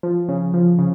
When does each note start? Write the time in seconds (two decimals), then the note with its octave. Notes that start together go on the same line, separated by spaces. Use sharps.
0.03 F3
0.29 C#3
0.54 F3
0.79 C#3